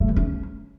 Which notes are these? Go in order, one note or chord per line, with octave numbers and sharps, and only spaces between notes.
A3
E3
C#4